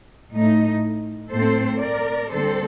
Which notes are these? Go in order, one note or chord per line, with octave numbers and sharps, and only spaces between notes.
A2 A3 D#4
A2 A3 C4 A4 C5
A#4 D5
D3 G3 C4 A4 C5